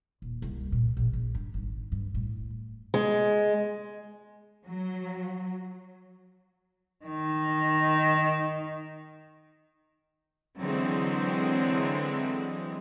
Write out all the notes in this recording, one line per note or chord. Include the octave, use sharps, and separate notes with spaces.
D#1
C2
A#2
A#1
A#1
G2
G#1
G2
A2
G#3
F#3
D#3 D#4
D3 E3 F#3 G#3 C4